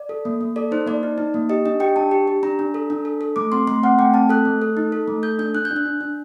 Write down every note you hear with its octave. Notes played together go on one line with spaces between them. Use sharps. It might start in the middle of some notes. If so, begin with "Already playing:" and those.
Already playing: D5
A4
A#3
A#3
A4 D5
D#4 C5
A#3 D5
D#4
D#4
A#3
G4 D#5
D4 D#5
G4 G5
D4 A5
G4
G4
D4 A#5
D4
A4
D4
A4
A4
A3 D6
C4 C6
A3 C6
C4 F#5
A3 G5
C4 A5
A4 F#6
A3
A4
D#4
A4
A3
A4 G6
D4 G6
D4 F#6
G6
D4
F#6
D4
D4